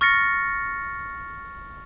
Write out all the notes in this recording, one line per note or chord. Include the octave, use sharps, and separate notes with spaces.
C#6 F6 A6 A#6 C#7